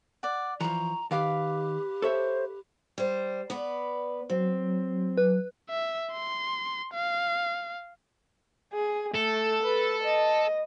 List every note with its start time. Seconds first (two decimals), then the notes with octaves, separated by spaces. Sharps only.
0.23 D5 F#5
0.61 E3 F3 A#5 C#6
1.11 D#3 G4 B4 F5 D6
2.02 A4 C5 C#5 E5
2.98 G3 C5
3.50 B3 B4 D5
4.30 F#3 C4
5.18 B4
5.70 E5
6.12 C6
6.94 F5
8.74 G#4
9.15 A3 A4
9.63 B4
10.04 D#5